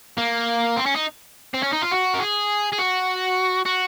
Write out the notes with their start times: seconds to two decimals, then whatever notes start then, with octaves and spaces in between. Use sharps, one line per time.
0.18 A#3
0.76 C4
0.86 C#4
0.96 D#4
1.54 C4
1.63 C#4
1.73 D#4
1.83 F4
1.92 F#4
2.15 A#4
2.21 G#4
2.73 G#4
2.79 F#4
3.65 F#4